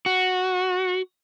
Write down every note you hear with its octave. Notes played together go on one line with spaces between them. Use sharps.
F#4